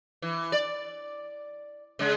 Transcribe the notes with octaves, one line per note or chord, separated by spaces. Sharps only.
E3
D5
C#3 G#3